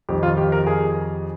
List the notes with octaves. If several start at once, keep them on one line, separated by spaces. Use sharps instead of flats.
F2 D#3 G3 G4
F4
G4
A#4
G#4